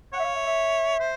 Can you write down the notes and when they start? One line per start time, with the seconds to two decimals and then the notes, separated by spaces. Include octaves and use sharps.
0.13 C#5 F#5
0.19 E5
0.24 F5
0.35 E5
0.46 E5
1.00 C5